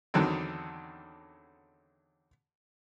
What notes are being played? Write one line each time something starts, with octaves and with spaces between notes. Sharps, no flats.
E2 D3 D#3 F#3 C4